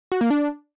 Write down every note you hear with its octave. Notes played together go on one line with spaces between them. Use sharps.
F#4
A#3
D4